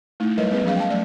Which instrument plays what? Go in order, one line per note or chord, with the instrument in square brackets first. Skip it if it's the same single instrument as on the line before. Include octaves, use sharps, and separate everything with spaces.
[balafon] A3 D#4 E4
F#3 G3 A#4 B4 C#5 D#5
G3 B3 C#4 G#4 A#4 B4
F3 F#3 C#4 G#4 F5
G5 A5
F#3 A3 D5